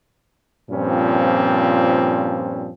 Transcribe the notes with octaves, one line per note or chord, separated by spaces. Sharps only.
G2 A#2 F3 C4 C#4